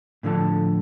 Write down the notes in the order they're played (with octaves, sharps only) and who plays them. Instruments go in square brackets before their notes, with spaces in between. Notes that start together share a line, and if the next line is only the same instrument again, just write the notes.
[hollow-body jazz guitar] A2 D3 F3 A4 A5